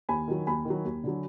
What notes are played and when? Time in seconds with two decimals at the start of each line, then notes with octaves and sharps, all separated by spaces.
0.09 D#2 G#5 B5
0.28 D#3 F#3
0.47 D#2 G#5 B5
0.65 D#3 F#3
0.85 D#2
1.04 D3 F#3